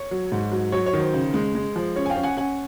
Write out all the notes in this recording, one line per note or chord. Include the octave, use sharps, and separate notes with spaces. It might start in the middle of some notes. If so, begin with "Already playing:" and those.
Already playing: C#5
F#3
G#2
F#3
F#3 C#5
C#5
D#3
C5
C#3
G#3
G#3
F3
C#4 C#5
G#5
F5 G5
C#4
F#5 G#5
C#4 F#5 G#5